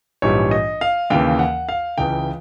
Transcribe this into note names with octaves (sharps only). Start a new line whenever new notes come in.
A#1 G#2 E3 G3 C#5
D#5
F5
D#2 C#3 E3 G5
F#5
F5
C#2 C#3 E3 G5